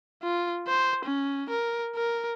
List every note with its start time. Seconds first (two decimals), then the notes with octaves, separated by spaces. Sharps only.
0.23 F4
0.67 C5
1.05 C#4
1.50 A#4
1.96 A#4